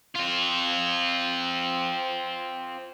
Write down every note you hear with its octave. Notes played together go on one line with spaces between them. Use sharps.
C4 F4